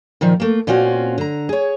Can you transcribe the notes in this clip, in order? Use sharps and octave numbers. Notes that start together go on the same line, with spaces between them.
A#2 D#3 F3
A3 A#3
A#2 C4 C#4 F4 F#4
D3 A#5
G#4 C#5